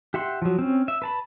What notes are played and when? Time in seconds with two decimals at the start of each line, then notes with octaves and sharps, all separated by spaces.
0.14 G4 E5 F#5 C6
0.42 F3 F#3
0.59 C4 C#4
0.88 E5
1.02 B4 A5 B5